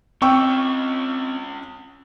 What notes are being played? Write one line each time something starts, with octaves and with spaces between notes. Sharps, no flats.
C4 C#4 F4 G5 C#6 E6